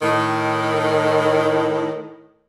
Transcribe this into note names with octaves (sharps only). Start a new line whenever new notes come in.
A2 D#3